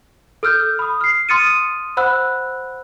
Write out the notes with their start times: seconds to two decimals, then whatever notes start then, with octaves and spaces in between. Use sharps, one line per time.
0.43 A4 E6 F6 G6
0.79 B5 D#6
1.01 F6 C7
1.29 C6 D#6 F6 A6 C#7 D#7
1.97 C5 F#5 B5 E6 F#6